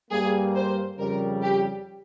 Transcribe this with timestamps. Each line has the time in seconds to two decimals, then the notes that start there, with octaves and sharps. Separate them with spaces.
0.10 G2 G3 A#3 G#4
0.55 C5
0.98 F2 C#3 G3 A#4
1.42 G4